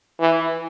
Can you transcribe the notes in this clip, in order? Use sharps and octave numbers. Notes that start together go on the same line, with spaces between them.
E3